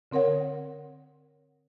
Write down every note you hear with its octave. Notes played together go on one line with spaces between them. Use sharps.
D3 C4 A#4 C#5 F#5